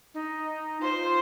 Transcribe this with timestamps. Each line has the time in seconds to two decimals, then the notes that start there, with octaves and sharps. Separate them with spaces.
0.14 D#4
0.81 F4 C5